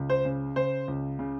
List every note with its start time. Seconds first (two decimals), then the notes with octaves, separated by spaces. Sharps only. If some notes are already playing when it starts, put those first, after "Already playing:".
Already playing: C#2
0.10 C5
0.25 C#3
0.56 C#3 C5
0.88 C#2
1.19 C#3